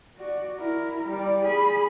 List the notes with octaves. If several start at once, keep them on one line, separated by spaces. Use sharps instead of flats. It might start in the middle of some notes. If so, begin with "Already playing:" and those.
F#4 D5
E4 A#4
G3 D5
G#4 B5